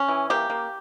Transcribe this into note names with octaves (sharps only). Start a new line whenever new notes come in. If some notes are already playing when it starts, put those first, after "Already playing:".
Already playing: C#4
E3
A#3 G4
A#3